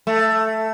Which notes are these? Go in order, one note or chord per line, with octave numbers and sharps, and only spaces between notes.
A3